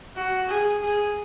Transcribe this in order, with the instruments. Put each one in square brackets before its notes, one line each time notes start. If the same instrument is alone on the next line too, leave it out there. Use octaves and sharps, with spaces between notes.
[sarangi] F#4
G#4
G#4